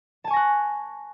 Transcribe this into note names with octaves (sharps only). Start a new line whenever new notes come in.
G#5 A5 C#6 F#6 A#6